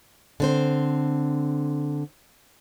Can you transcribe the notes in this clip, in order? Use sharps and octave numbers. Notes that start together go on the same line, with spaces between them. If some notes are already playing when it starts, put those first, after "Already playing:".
D3 C4 C5